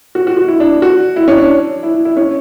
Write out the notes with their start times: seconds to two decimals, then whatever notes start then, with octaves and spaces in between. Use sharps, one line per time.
0.15 F#4
0.27 F#4
0.37 F#4
0.48 E4
0.60 D4
0.82 F#4
1.16 E4
1.28 C#4
1.38 D4
1.83 E4
2.05 E4
2.17 C#4